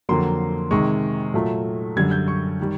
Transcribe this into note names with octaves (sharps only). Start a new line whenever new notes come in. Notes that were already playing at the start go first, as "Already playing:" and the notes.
F2 D3 F#3 A#3 C6
C3 D#3 G#3 C#6
A#2 F#3 A3
F#2 D3 G3 G#6
G6
C#6
D#3 G3